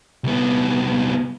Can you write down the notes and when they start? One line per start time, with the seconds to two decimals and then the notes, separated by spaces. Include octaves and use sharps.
0.24 C2 B3